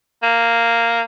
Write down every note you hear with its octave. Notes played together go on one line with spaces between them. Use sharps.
A#3